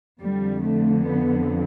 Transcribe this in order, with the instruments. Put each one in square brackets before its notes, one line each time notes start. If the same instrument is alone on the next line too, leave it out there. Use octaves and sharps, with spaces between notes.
[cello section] F2 D3 F3 G3
A3
B3